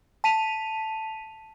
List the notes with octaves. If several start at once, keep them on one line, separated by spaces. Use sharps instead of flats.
A5 B6 D#7 F7